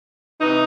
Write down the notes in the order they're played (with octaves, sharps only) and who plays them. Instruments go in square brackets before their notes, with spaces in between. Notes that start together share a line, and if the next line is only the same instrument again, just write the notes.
[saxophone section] C3 E3 D#4